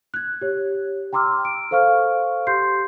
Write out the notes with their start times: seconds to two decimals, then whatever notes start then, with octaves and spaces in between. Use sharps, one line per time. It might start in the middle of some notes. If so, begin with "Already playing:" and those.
0.14 F#6 G#6
0.41 G4 C#5
1.13 G5 A#5 C6 D6 E6 F6
1.45 D7
1.71 A4 C5 F5 C#6 F6
2.47 G4 C6 G6 C7